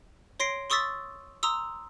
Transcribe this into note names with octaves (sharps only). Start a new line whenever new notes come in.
C#5 C6 A#6 C7 D7
C6 C#6 D#6 E6 A6 B6
A#5 C6 D#6 E6